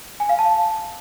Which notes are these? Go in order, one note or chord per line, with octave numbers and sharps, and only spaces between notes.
G#5
F5
A5